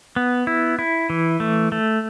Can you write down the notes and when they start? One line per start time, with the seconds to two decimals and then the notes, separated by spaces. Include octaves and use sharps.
0.16 B3
0.47 E4
0.79 E4
1.10 E3
1.40 A3
1.72 A3